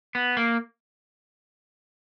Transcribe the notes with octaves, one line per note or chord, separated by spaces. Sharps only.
B3
A#3